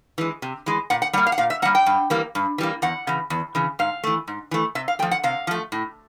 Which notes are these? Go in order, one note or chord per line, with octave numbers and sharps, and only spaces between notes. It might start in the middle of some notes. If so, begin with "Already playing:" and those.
E3 G#3
C3
E3 G#3
A#2 F#5
F#5
G3 A#3 F#5
F5
F#5
A#2 F5
E5
G3 A#3 F#5
G5
G2
E3 G3 A#3
G2
E3 G3 A#3
E2 F#5
C#3 E3
E2
C#3 E3
G#2 F5
E3 A3
G#2
E3 A3
C3 E5
F5
F3 A3 G5
F#5
C3 F5
F3 A3
A2